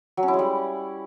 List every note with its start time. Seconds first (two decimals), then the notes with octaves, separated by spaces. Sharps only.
0.17 F#3
0.23 C#4
0.28 E4
0.33 G#3
0.39 G3